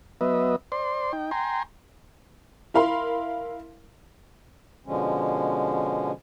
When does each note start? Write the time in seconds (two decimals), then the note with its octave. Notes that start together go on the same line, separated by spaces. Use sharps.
0.21 F#3 B3 B4 D#5 E5
0.72 C5 D5 C6
1.13 D#4 G5
1.31 G5 G#5 A#5 C6
2.74 E4 A#4 F5 B5 C6
4.86 B2 D3 F3 G#3 C#4